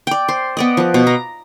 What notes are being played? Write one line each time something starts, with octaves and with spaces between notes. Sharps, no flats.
D5 G5
C5
B3 D5 D#5
F3 B4
B2
A#5